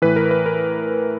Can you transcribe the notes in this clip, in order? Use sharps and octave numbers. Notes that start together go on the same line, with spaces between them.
A2 E3 B4
A#4
B4
A#4